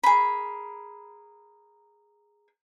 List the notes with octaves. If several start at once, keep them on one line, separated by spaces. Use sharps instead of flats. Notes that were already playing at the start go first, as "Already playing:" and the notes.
G#4 A#4 B5